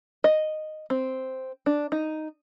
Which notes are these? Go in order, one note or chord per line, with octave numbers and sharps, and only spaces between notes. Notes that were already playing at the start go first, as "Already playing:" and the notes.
D#5
C4
D4
D#4